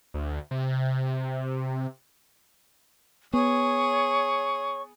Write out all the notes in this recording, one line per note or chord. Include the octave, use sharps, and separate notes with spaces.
D2
C3
B3 G#4 C#5 C#6